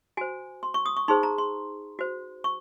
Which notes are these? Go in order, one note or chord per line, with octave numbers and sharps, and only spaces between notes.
F#4 C5 G#5
C6
C#6
D#6
C#6
D#4 G#4 C5 C6
A#5
C6
F#4 C5
C#6